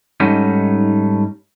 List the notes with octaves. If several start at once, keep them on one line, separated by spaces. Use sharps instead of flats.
G#2 G3 A3 C#4 D#4